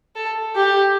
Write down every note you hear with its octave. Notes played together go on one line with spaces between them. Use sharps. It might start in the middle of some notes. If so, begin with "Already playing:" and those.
A4
G4